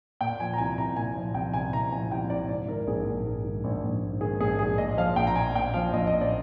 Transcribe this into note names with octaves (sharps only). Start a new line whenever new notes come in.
A#2 G5
F3 G#5
A#5
C2 G#5
C2 A#5
A#2 G#5
F3
C2 G5
C2 G#5
A#2 A#5
F3 G#5
C2 G5
C2 D5
G#2 D5
D#3 A#4
A#1 G#4
A#1
G#2
D#3
A#1
A#1
G#2
D#3 G#4
A#1 G#4
A#1 G#4
A#2 D#5
F3 F5
A#1 G5
A#5
A#1 G#5
A#2 G5
F3 F5
A#1 D#5
A#1 D#5
D5